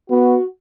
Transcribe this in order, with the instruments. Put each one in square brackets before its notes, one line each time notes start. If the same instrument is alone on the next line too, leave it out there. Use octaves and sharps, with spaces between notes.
[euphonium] B3 [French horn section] F#4